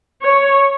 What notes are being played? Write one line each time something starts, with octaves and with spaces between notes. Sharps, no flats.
C#5